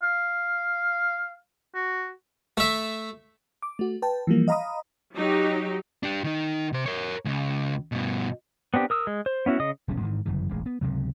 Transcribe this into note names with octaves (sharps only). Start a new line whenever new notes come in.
F5
F#4
A3 E5
D6
A3 F#4
B4 G5 A5
E3 F3 G3 A#3
D#5 F5 A#5 B5 D#6
F#3 D#4 G4
D4 G4
D#3 D#4
C3 C5
A#4 C#5
C#2 C#3
G2 B2
B3 C4 D4 G4
A#4 D#6 E6
G#3
C5
B3 C#4 E4 F#4
C#3 D#5 D#6
E1 B1 G3 C#4
G#2 D#3 E3
G1 F#2 C#3 E3
E1 A1 G#3
B3
C#2 G2 C3 F#3